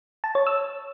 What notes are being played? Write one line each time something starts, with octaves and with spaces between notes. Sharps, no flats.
A5
C#5
E6